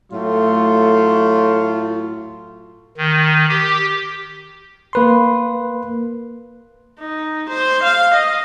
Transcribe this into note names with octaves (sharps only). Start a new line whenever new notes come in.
A2 F#3 A3 F4
D#3
G4
A#3 B4 C6
D#4
C5
F5
D#5